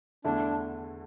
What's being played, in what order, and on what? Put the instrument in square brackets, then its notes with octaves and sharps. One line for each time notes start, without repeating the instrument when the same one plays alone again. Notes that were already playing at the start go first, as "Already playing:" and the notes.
[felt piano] E2 D3 A3 E4 [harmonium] D4